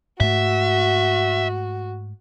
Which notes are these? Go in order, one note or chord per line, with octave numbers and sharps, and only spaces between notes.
G#2 A3 F#4 E5